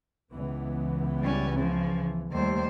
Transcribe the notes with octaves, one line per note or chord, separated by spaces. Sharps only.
C#2 E3 B3
G3 C#4
C#3 F3
D#2 G3 A3 C5